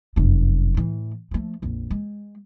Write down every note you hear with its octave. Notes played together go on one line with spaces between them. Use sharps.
F1 F#2
A2 E3
F3 A3
A#1 F2
G#3